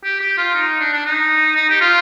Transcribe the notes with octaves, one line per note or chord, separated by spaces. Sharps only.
G4
G4
F4
D#4
D4
D4
D#4
D#4
G4
F4